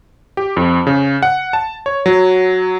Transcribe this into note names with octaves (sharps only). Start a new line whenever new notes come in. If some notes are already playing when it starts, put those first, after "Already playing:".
G4
F2
C#3
F#5
A5
C#5
F#3